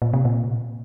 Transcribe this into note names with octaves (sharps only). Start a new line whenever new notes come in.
A#2
C3
A#2